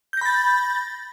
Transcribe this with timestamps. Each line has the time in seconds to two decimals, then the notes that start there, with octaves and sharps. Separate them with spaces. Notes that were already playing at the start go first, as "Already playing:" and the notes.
0.13 G6
0.17 A#6
0.21 B5
0.26 A6